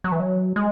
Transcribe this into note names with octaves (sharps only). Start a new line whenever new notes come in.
F#3
E3
F#3
G#3